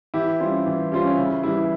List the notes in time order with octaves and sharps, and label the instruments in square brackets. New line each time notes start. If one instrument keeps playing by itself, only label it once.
[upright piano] E3 [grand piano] E4 G4
[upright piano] G3 C#4 F4 C5
E3
G3 C#4 F4 C5
[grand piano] C#4
[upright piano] C#3 [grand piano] E4
[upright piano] E3 G3 [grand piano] E4